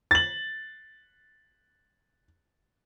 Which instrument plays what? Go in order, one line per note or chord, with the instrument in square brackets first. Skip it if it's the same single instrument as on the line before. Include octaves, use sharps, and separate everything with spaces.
[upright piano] A6 F#7